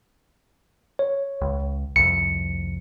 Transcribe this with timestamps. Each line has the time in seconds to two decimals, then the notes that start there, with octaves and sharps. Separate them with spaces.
0.99 C#5
1.41 C#2
1.96 C2 F2 C#7